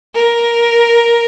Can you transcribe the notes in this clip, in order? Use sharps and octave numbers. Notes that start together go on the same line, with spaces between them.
A#4